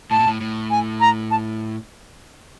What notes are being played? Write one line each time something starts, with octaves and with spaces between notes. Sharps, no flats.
A2 A5
A#2
A2
A2
G#5
A#5
A5